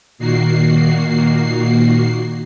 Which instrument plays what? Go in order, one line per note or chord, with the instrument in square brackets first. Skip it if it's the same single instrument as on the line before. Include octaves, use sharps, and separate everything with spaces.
[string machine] A#2 D#3 A#3 F#4 C7